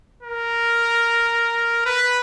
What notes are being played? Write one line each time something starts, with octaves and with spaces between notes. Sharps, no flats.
A#4
B4